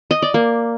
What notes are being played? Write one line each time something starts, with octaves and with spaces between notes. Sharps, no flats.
D#5
D5
A#3